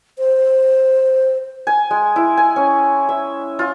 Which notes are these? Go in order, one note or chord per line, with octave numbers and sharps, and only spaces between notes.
C5
G#5
G#3
E4
G#5
C#4
E5
F4